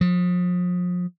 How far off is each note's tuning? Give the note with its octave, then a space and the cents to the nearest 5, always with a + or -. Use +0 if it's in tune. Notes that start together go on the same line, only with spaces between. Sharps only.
F3 +35